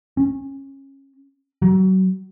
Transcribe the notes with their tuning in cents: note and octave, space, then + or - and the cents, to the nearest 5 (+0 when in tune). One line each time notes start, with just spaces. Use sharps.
C#4 -20
F#3 +30